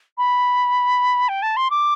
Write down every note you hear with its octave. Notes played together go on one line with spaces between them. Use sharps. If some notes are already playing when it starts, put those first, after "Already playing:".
B5
G5
A5
C6
D6